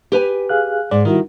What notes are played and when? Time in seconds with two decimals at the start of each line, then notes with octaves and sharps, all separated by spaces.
0.12 G4 B4 G#5
0.49 G#4 F5 F#6
0.91 G#2 D5
1.05 D#3 G3 E4 F#4